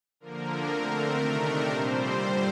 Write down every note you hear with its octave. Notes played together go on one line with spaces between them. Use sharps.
D3 F3 A#3 A#4
D3 A3 C4
C3 D#3 A3 D4
A#2 G3 C4 C5
G2 D3 G3